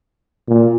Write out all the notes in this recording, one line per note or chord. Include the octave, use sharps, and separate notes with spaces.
A#2